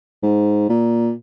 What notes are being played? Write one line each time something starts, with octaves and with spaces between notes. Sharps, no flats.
G#2
A#2